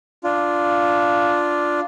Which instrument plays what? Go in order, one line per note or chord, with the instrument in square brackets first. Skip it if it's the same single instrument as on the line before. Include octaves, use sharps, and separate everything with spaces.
[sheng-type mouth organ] D4 F4